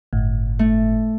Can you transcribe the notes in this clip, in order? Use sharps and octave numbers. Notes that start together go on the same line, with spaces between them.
G1 A2
A3